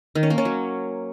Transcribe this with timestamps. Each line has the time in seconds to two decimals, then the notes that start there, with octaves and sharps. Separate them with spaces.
0.15 D#3
0.23 C#4
0.30 A#3
0.38 C#4
0.45 F#3